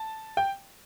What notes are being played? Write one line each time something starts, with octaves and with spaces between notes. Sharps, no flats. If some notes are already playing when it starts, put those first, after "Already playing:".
Already playing: A5
G5